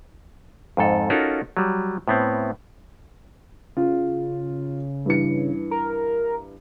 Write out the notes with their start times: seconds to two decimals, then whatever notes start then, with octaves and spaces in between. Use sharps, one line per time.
0.77 F2 G#2 A4
1.10 C#4 D#4 F4 F#4 A4 A#4
1.57 F#3 G3
2.08 A2 B3 C4
3.77 C#3 F4
5.06 G2 E3 C#7
5.71 A#4